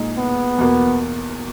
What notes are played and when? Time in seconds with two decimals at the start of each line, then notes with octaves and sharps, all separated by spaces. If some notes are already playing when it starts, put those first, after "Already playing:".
Already playing: A#2 G#3 D#4
0.17 B3
0.58 E2 B2 A#3